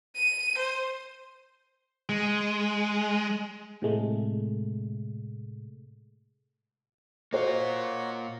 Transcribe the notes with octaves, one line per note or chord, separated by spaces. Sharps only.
D#7
C5
G#3
A2 C3 G#3 A3
A#3 F4 F#4 C5 C#5 D#5 F#5 A#5